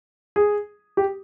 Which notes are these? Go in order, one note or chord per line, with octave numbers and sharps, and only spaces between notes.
G#4
G4